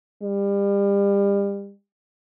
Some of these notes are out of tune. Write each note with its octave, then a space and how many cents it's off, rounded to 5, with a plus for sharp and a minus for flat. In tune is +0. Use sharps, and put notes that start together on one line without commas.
G3 +35